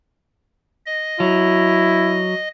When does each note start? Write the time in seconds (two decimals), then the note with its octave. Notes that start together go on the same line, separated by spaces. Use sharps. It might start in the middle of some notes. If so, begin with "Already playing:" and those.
0.86 D#5
1.20 F#3 E4